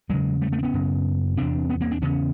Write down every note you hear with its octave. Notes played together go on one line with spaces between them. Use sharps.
E2 C#3 F#3 G#3
G3 A3
A3 B3
C4
B3 C#4
F#2 C#3
E2 C3 C4 D4
B3 C#4
A#3 C4
C4 D4
E2 C#3 B3 C#4